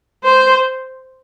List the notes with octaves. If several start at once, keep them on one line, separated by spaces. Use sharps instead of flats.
C5